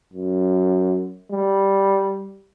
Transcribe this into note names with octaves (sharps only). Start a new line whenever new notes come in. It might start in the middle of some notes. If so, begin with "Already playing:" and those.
F#2
G3